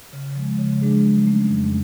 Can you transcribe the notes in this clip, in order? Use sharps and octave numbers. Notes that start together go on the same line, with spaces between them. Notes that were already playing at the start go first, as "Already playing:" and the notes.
C#3
F3 G#3
C#3
F3 G#3 D4 G#4
F#3
A3 C#4
F2